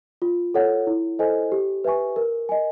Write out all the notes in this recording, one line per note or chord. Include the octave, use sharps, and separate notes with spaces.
F4
A4 C#5 F#5
E4
A4 C5 D#5 G#5
G4
B4 E5 G#5 C#6
A#4
D#5 G#5